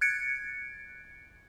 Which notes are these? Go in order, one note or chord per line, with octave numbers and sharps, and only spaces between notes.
F#6 G#6 A6 C#7 D7